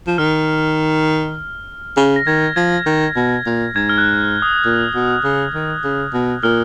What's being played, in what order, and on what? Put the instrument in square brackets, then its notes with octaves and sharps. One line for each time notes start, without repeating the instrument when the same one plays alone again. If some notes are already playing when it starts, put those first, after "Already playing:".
[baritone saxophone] F3
[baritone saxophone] D#3 [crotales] F6
[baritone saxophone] C#3 [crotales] F6
[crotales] A#6
[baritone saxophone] D#3 [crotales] G#6
[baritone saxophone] F3 [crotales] G#6
[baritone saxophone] D#3
B2
A#2
[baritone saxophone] G#2 [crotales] G#6
[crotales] F6
F#6
D#6
[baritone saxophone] A#2
B2
C#3
D#3
C#3
B2
[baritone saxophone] A#2 [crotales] F6